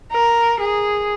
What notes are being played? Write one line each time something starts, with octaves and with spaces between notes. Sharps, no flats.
A#4
G#4